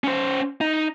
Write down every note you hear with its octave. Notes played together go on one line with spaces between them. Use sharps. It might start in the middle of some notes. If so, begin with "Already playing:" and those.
C#4 C5
D#4